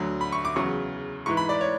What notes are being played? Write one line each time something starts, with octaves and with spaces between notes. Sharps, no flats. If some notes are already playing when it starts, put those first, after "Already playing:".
Already playing: D2 D3 F#3
B5
C#6
D6
E2 C#3 F#3 C#6
G#2 E3 C#6
B5
D5
C#5